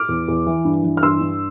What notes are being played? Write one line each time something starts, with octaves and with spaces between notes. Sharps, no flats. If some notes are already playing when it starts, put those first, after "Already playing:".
Already playing: D6 F6
E2
E2
E3
G2
E3
F6
G2 C6 E6
G2